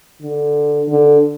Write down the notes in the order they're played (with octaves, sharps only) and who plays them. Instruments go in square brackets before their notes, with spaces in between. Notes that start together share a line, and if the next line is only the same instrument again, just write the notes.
[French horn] D3
D3